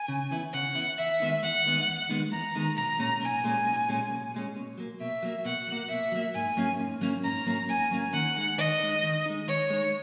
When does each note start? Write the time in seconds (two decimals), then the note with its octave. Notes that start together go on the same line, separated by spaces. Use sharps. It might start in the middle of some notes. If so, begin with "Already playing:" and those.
Already playing: G#5
0.08 C#3
0.31 E3 B3 E4
0.54 C#3 F#5
0.75 E3 B3 E4
0.99 E2 E5
1.20 D#3 G#3 B3 D#4
1.43 E2 F#5
1.66 D#3 G#3 B3 D#4
1.87 E2
2.09 D#3 G#3 B3 D#4
2.32 E2 A#5
2.55 D#3 G#3 B3 D#4
2.77 B1 A#5
2.99 A#2 G#3 C#4
3.22 B1 G#5
3.44 A#2 G#3 C#4
3.67 B1
3.89 A#2 G#3 C#4
4.11 B1
4.34 A#2 G#3 C#4
4.56 B2
4.78 F#3 A#3
5.01 B2 E5
5.22 F#3 A#3
5.45 B2 F#5
5.67 F#3 A#3
5.90 B2 E5
6.12 F#3 A#3
6.35 G#2 G#5
6.57 F#3 A#3 C#4
6.79 G#2
7.01 F#3 A#3 C#4
7.24 G#2 A#5
7.47 F#3 A#3 C#4
7.69 G#2 G#5
7.91 F#3 A#3 C#4
8.13 D#3 F#5
8.36 G#3 D#4
8.58 D#3 D#5
8.80 G#3 D#4
9.03 D#3
9.26 G#3 D#4
9.47 D#3 C#5
9.70 G#3 D#4